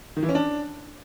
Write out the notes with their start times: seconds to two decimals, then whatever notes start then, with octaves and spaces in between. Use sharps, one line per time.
0.16 D#3
0.23 E3
0.29 C#4
0.35 D4